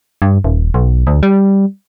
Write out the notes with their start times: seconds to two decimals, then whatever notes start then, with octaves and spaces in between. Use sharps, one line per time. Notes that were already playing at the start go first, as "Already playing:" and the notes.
0.22 G2
0.44 D#1
0.74 B1
1.07 D2
1.23 G3